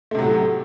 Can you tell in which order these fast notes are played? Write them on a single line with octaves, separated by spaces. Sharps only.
A3 C3 F#3 A2